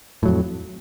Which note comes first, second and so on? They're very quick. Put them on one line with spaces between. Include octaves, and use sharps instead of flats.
A2 F#3 F2